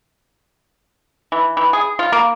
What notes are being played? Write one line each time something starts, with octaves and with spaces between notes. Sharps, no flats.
E3
E3
G#4
F4
A#3